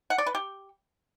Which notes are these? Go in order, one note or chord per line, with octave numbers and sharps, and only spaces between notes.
F#5
D5
B4
G4